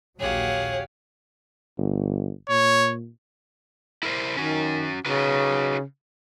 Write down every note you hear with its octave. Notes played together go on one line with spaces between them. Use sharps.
A#1 D#2 F#3 G4 G#4 C#5 F5 F#5
G1
A#2 C#5
E4 A#4 C5
D#3 C#4 F#4
C#3 D#4 F#4 B4